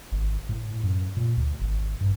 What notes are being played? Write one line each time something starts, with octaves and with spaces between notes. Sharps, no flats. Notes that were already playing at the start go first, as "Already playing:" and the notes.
G#1
A2
F#2
A#2
D2
G#1
G2